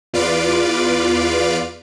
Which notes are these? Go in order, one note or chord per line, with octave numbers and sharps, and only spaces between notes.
E2 F4 B4 D5 F5 D7